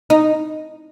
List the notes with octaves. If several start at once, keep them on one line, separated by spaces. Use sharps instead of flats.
D#4